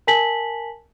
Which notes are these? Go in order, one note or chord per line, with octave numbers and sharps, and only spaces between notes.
A#4 G#5 A5 B6 F#7